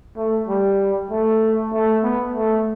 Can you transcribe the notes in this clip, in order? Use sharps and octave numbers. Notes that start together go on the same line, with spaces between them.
A3
G3
A3
A3
B3
A3